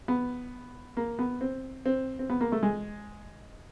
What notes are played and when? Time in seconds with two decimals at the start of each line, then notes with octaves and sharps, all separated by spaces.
0.08 B3
0.97 A#3
1.19 B3
1.41 C4
1.86 C4
2.19 C4
2.30 B3
2.41 A#3
2.52 A3
2.63 G#3